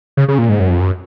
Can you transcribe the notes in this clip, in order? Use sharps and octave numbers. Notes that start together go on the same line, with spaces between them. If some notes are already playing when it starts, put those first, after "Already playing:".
C#3
C#3
A#2
G#2
F#2
F2
F#2